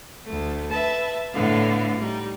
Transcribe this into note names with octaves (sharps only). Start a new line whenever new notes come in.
D2 A3
B4 E5 A5
A2 D3 B3 F5
G3 D#4